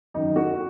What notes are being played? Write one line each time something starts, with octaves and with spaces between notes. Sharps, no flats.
F#2 D#3 D#4
F#4